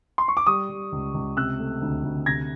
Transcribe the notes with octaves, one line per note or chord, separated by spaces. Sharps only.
C6
C#6
D6
G3 C#6 D#6
G3
C#2
C#2
C3 E6 F#6
A3
D2
D2
C3 G#6 A#6